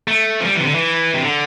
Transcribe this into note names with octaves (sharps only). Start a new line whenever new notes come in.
A3
F3
G3
E3
C3
D3
E3
C3
D3